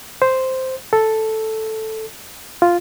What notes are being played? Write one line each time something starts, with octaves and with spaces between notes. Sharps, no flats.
C5
A4
F4